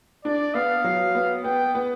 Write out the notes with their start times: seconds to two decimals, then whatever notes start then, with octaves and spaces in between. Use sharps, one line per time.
0.25 D4 D5
0.54 B3 F5
0.84 F#3
1.15 B3
1.44 B3 G5
1.75 B3